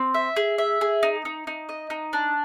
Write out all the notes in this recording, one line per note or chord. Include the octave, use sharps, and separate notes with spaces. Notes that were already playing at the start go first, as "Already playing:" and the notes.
Already playing: C4
E5
G#4
E5
G#4
D#4
D#4
D#4
D#5
D#4
D4